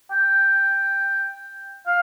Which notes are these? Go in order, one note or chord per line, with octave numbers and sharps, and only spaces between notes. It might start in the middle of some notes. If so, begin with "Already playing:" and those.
G5
F5